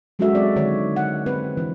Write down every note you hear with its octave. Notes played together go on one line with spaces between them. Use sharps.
F#3 G#3 C#4 F#4 A4 E5
C4 D5
D3 D#3 C#5
F#5
C4 B4
E3